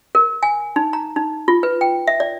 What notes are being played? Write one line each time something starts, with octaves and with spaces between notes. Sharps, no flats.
A#4
G#5
D#4
A#5
D#4
F4
B4
G5
E5
D5